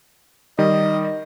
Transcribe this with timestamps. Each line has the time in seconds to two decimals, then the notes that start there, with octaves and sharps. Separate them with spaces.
0.59 D#3 G3 D#5